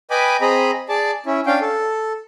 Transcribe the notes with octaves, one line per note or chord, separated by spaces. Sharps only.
B4 D#5 G5 G#5 B5 D6
C4 G#4 D#5 A#5 B5
G#4 D5 A5
C#4 E4
C#4 D4 F5 G5
A4